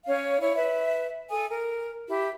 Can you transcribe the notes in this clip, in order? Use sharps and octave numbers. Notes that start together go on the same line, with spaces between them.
C#4 C#5 F5
E4 C#5
B4 E5
A4 G#5 D#6
A#4
E4 G4